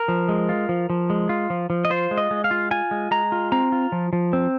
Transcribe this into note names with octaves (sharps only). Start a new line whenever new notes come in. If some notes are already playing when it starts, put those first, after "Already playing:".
Already playing: A#4
F3
G#3
F4
F3
F3
G#3
F4
F3
F3
D#5
F4 C5
G#3
D#5
G#3
F5
F4
F4 G#5
G#3
G#3 A#5
F4
C4 A#5
F4
F3
F3
C4